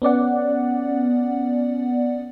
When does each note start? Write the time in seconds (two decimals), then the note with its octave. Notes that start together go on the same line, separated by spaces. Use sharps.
0.02 B3 C#4 D5 F#5